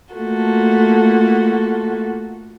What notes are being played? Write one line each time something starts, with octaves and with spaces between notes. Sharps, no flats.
A3 A#3 F4 F#4 A4